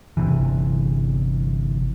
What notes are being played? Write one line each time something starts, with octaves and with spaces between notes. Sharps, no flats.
G1 D2 C3 E3